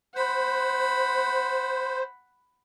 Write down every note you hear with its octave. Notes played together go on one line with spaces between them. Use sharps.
C5 F#5 B5